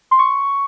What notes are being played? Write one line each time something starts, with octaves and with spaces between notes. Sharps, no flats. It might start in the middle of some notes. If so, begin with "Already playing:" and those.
C6
C#6